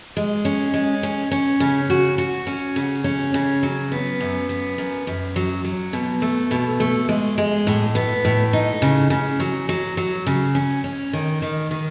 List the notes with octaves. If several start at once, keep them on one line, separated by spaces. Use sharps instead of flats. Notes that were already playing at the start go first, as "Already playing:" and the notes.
G#3
C#4
G#3
C#4
C#4
C#3
F#4
F#4
C#4
C#3
C#4
C#3
F#3
B3
F#2
B3
F#2
F#2
F#3
F#3
B2
A3
B2
A3
G#3
G#3
A2
B3
A2
D#4
C#3
C#3
F#3
F#3
F#3
C#3
C#4
C#4
D#3
D#3
D#3